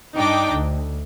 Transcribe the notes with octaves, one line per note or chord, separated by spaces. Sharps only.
G2 D4 D#4 D#5 G5 D6
D2